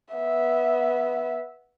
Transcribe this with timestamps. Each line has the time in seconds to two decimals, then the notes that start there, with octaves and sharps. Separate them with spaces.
0.14 B3 E5